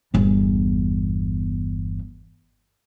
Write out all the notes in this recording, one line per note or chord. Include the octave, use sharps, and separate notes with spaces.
G1 E2